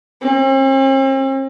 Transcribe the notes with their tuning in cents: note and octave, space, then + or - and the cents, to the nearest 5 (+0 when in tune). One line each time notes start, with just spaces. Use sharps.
C4 +45